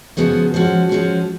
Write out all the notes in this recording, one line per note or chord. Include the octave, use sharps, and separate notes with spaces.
C#3 F3 G#3 B3 F#4
F3 G#3 C#4 F#4
F3 G#3 C#4 F#4